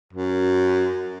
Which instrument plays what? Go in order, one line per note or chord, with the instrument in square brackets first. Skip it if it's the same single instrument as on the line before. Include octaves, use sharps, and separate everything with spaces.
[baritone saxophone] F#2